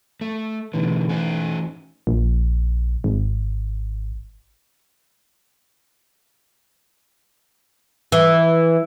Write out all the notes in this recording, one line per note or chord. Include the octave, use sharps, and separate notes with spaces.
A3
B2 D3 E3 A3 D#4
C#4 F#4 C5
A#1
G#1
E3